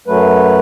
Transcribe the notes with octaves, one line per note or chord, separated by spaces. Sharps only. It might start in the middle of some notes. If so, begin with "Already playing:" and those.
F#2 F#3 A3 B4